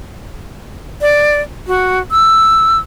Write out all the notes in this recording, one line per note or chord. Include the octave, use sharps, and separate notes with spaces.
D5
F#4
E6